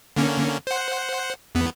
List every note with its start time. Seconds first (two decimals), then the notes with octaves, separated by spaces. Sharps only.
0.16 D3 A#3 C#4
0.67 C5 F#5
1.55 E2 B3